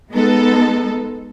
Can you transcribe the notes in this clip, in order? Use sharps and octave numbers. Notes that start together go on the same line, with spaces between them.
G#3 B3 D#4 A4